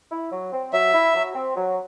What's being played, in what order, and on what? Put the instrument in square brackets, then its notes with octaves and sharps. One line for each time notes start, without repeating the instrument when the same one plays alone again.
[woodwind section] E4
F#3
C4
[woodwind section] F#3 [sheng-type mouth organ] E5
[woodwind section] E4
F#3
C4
F#3